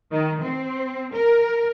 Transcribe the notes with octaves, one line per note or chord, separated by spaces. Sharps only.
D#3
C4
A#4